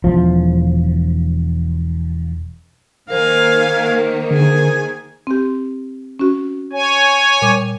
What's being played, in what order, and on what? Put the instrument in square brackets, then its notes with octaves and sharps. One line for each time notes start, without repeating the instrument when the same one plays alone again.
[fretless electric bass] E1 F3
[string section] D#3 A#3 [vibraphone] A#4 C5 [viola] F5 G#5
[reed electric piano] D3 [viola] G#4 G#5
[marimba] C4 G4
C#4 F#4
[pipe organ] C#5 G#5
[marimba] A#2 G3 D6